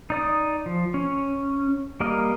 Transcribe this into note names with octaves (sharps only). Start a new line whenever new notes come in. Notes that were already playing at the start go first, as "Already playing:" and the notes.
D#4 D5 D#6
F3
C#4
G3 A#3 A#4 D#5